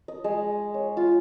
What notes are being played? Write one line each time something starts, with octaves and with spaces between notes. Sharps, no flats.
D#5
G#3
C#5
F4